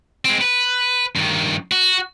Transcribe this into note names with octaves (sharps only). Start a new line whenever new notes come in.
G#3 C4
B4
G2 D#3
F#4